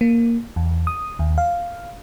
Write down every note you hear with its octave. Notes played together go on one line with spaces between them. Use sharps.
A#3
E2
D#6
D#2
F5